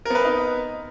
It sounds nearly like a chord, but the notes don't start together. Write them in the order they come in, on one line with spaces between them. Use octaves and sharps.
A#4 B3 B4 C4 D#4